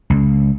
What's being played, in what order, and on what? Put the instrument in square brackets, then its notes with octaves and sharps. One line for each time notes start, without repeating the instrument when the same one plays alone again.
[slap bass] C#2